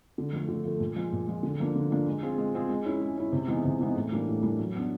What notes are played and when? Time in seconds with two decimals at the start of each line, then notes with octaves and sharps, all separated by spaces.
0.18 D3
0.33 F3 A3
0.49 D3
0.65 F3 A3
0.80 A#2
0.96 F3 G#3
1.12 A#2
1.28 F3 G#3
1.43 D3
1.60 F3 A#3 D4
1.75 D3
1.91 F3 A#3 D4
2.06 G#3
2.23 C4 F4 G#4
2.38 G#3
2.55 C4 F4 G#4
2.69 G#3
2.85 C#4 E4
3.01 G#3
3.18 C#4 E4
3.32 C3
3.48 E3 G#3 B3 D#4
3.65 C3
3.81 E3 G#3 B3 D#4
3.96 A2
4.12 E3 G3 A#3 D4
4.28 A2
4.43 E3 G3 A#3 D4
4.59 F#3
4.75 B3 D4